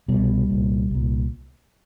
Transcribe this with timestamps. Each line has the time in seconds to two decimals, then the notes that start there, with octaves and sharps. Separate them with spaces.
0.08 C2 B2 G3
0.49 C2 A#2
0.90 C2 A#2